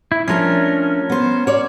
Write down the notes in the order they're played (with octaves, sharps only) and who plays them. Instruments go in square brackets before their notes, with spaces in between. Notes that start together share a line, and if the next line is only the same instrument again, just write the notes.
[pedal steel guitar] E4
[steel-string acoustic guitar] F3 A3 D4 [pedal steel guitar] C#4 A#4
[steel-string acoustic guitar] B3 C5
C#5 D5